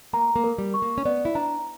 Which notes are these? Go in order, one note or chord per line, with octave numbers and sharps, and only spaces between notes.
A#3 A#5
A#3
A#4
G3
C#6
A#3
C#4
B3 D5
E4
D4 A#5